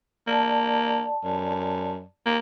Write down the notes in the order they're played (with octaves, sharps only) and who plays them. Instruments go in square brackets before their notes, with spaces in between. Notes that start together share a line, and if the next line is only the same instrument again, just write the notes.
[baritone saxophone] A#3 [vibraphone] D5 A5
[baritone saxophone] F#2
A#3